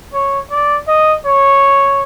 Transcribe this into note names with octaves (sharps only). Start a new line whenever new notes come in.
C#5
D5
D#5
C#5